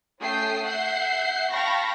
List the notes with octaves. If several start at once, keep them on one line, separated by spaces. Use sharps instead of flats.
A3 C#4 G5 D#6 C7
E5 F#5 G6 C7
F5 G5 A5 B5 C#6 A#6